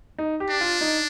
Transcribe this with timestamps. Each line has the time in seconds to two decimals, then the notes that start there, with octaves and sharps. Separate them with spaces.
0.18 D#4
0.40 G4
0.50 D4
0.61 F4
0.81 D#4